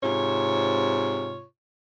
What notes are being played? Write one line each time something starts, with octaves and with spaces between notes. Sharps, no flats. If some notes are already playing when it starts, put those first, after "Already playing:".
G#2 C3 F4 C#5